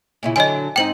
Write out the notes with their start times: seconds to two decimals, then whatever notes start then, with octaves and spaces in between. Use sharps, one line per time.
0.23 A#2 C#3 E4
0.36 D3 F#3 D4 D#5 G#5
0.76 G#2 C4 D#4 G5 F#7